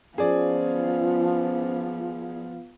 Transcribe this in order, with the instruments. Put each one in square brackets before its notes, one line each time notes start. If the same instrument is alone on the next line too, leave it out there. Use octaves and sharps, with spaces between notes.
[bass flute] F3 [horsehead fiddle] B3 F4 [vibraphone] C#4 C5 [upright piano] G#4 D5